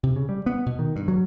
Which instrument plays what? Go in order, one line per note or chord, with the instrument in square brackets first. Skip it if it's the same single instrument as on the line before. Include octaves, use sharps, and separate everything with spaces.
[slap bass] C3
C#3
G3
B3
B2
D#3
G2
F#3